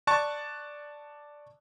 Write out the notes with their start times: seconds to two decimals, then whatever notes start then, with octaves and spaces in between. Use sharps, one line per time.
0.07 D5 A5 C#6 F#6 A6